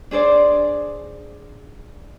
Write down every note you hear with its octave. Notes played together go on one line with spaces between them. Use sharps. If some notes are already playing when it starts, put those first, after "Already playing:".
D4 G#4 C5 D5